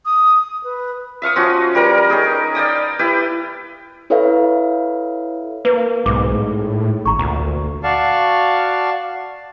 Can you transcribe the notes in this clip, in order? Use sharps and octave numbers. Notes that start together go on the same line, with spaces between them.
D#6
D#6
B4
E5 F5 C#6 D#6
F3 C#4 F#4
G3 A#4 B4 A#5
C#4 D#4 G#4 G5
D5 F5 G5 D#6
E4 G4 B4
E4 A4 B4 C#5 E5 F5
A#3 B4
B1 G#2 D6
A2
G#1 A#5 C#6
D2 A#2
F#4 D5 F5 A5 C#6